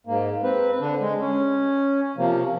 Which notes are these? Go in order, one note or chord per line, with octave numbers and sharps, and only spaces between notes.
G#2 A#3
C4 B4
D3 D4
G#3
C#4
C3 F3 A#3